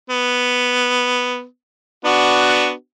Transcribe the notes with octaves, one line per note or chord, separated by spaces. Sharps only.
B3
B3 D4 F#4